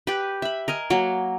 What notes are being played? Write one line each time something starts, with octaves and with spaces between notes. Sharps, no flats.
G4 B4
E5 B5
A#4 D#5 G#5
F#3 A#3